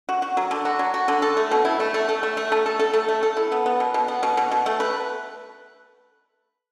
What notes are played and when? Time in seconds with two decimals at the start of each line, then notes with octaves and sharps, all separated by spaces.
0.09 F#4
0.22 F#4
0.37 F#3
0.51 D3
0.65 F#4
0.79 F#3
0.94 F#4
1.08 D3
1.22 A4
1.37 A3
1.51 B2
1.65 E4
1.80 A3
1.94 A3
2.09 A4
2.23 A3
2.37 A3
2.52 A3
2.66 A4
2.79 A4
2.93 A3
3.08 A3
3.23 A4
3.37 E4
3.52 B3
3.66 B3
3.80 B2
3.94 B2
4.08 B3
4.23 B2
4.37 B2
4.51 B2
4.66 A3
4.80 B4